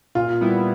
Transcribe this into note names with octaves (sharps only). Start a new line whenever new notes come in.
A#2 F4
G3 B3 E4